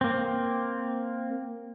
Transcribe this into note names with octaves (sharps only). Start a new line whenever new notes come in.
A#3 C4